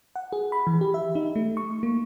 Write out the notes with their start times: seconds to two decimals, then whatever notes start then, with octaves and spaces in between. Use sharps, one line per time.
0.16 F#5
0.33 G#4
0.52 B5
0.67 E3
0.81 G4
0.94 E5
1.15 D#4
1.36 A3
1.57 C#6
1.83 A#3